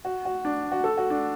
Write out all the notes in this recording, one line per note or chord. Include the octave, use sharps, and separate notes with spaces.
F#4
F#4
D4
F#4
A4
F#4
D4